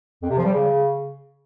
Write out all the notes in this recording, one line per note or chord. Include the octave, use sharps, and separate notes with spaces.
F2
C3
F3
G3
C#3